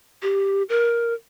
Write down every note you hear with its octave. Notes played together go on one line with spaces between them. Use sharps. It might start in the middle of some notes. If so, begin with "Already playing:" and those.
G4
A#4